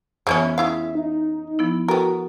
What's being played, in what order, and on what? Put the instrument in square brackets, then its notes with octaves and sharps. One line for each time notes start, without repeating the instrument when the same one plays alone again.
[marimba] F2 E3 B3 [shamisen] C#3 G#3 C#4 [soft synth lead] E5
[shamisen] C#3 E4 F5
[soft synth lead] D#4
[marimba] F3 B3 E4
[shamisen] B3 A#4 [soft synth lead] F#4 [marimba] A4 G5